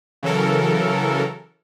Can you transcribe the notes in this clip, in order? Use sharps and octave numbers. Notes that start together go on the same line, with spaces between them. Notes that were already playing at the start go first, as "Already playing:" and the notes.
C#3 E3 F#3 A4 A#4